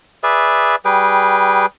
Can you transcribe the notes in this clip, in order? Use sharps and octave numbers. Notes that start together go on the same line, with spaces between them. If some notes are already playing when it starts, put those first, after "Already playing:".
G#4 B4 D5 E5
G3 G#4 B4 G5